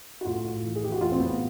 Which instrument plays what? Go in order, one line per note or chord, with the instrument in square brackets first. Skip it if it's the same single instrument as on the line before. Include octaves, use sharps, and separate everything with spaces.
[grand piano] F#4
A2 F4
A2
E3
G#4
E3 G4
F#4
A2 F4
C4
A2 B3